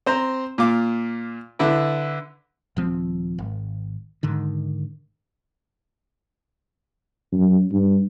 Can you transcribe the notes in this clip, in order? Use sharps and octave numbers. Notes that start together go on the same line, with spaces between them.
C4 C5 A#5
A#2 F4 D6
D3 E4 B4
D#1 F3 C4
G#1
G#2 D3 D#3
F#2
G2